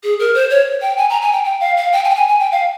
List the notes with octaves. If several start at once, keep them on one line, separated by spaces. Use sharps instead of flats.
G#4
A#4
C5
C#5
G5
G#5
A#5
G#5
G5
G5
F5
F5
G5
G#5
G5
G#5
G#5
G5
F5